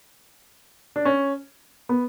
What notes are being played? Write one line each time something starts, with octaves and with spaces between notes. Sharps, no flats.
D4
C#4
B3